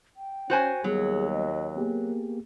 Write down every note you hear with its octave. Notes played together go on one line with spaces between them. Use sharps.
G5
C#4 F#4 C5 G#5
D#2 F#3 G3 B3 G#4
D#5
A#3 B3 G4 G#4